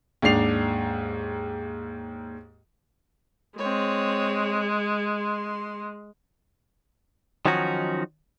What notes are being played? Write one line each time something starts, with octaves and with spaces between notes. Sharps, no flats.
D#2 G#2 D4 C7 F7
G#3 C4 C#5
C6
D#3 F3 F#3 C#4 D#4 F#4